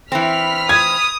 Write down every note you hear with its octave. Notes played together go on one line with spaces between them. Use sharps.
E3 C4 B5 F6 B6
D#6 G#6